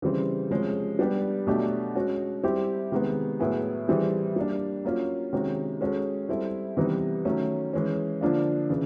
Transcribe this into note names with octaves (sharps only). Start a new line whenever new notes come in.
C#3 E3 G3 C4
C3 F3 G#3 C#4
G3 B3 D4 G4
B2 F#3 A3 D4 G4
G#3 C#4 F#4
G3 C4 E4 G4
C3 D#3 G#3 B3
A2 F#3 B3 E4 G#4
E3 G3 C4 E4 G#4
G3 A#3 D4
F#3 A#3 C#4 F4
C3 D#3 G#3 C#4 F#4
G#3 C#4 F#4 A4
G3 C4 E4 A4
C3 E3 G3 B3 D#4
D#3 F#3 A3 C#4
E3 G#3 C#4
D3 F3 A#3 D4 F4
C#3 E3